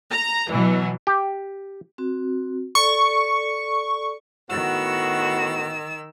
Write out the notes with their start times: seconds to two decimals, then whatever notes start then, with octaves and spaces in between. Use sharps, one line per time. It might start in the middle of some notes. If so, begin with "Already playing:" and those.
0.10 A#5
0.48 B2 E3 F#3
1.07 G4
1.98 C4 F#4
2.75 A4 D5 C#6
4.49 A2 D#3 B3 F#4 E6